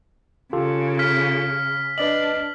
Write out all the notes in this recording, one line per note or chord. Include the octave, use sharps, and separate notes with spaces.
C#3 F4 G4 A4
F6 B6
D4 B4 D5 D#5 F#7